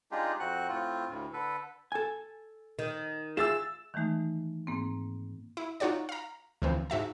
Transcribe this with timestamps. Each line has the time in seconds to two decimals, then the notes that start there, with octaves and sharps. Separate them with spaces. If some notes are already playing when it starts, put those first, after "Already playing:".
0.11 G#3 D4 D#4 F4 G4 G#4
0.40 F2 C4 F#4 C#6 F#6
0.69 A2 C4 F4
1.09 D2 A2
1.33 D3 A4 B4
1.92 A4 G#5
2.79 D#3
3.37 F4 G#4 E5 E6 A6 E7
3.94 D#3 E3 G#3 A3 D#4
4.67 G#2 A#3 C4
5.57 E4
5.80 D#4 F4 F#4 C#5 D5
6.09 F5 A#5
6.62 D2 E3 F3 C4
6.90 G#2 F#4 E5 A5